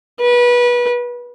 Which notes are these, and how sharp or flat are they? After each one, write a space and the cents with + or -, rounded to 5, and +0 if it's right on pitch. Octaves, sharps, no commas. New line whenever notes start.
B4 -25